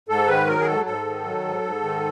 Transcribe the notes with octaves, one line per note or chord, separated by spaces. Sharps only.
G#2 A4
D#3 B4
F#3 A#4
G#4
G#2 A4
G#2 A4
D#3
F#3
G#2
G#2
D#3